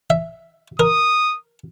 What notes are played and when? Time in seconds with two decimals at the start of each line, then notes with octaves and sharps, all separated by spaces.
0.10 E5
0.80 A#4 D#6